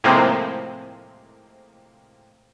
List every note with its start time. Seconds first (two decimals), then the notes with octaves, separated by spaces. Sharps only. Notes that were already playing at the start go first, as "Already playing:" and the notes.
0.04 A2 C3 F3 G#3 A#3 C4